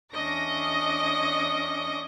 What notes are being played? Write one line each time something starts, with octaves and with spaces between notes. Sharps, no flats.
E2 C#4 D4 D#5 D6 A#6